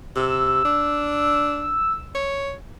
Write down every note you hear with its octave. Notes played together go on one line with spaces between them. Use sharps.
C3 E6
D4
C#5